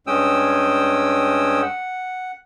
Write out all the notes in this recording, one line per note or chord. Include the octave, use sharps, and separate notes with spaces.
G2 G#3 C#4 G5 D#6 E6
F#5